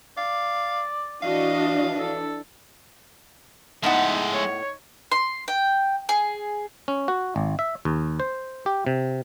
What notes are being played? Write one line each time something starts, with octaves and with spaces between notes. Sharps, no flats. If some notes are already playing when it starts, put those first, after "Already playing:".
D5 F5
E3 D4 F#4 D#5 F5
A4
A2 G#3 B3 D#4 E5 F#5
C#5
C6
G5
G#4
C#4
F#4
G#1
E5
D#2
C5
G4
C3